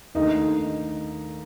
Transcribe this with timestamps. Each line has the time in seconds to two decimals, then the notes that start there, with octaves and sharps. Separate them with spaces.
0.15 D#2 D3 A3 D#4